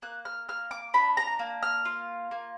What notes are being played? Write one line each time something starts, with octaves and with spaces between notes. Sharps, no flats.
A#3 F#6
F6
A#3 F6
D6
D4 B5
A#5
A#3
F6
F4
A#3